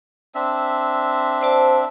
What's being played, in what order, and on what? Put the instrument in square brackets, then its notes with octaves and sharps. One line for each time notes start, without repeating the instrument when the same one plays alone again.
[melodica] C4 D4 E5
[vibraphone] C5 D5 A5